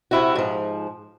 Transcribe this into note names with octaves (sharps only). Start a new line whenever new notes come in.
C3 E4 F#4
G#2 F3